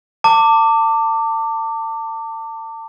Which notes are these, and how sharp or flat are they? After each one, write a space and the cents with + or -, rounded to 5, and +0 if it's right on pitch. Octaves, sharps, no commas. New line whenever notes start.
A5 +35 D6 +0